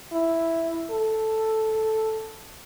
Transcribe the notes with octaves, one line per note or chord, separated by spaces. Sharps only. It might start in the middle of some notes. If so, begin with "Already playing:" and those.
E4
A4